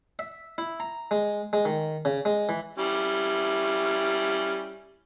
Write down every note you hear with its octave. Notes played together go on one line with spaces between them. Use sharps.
E5
E4
A#5
G#3
G#3
D#3
C#3
G#3
E3
G3 C#4 E4